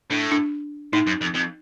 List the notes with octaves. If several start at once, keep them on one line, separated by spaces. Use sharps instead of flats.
A2 D4
D4
A2 D#4
F#2
F2
F2